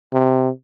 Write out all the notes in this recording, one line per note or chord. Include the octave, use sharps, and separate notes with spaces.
C3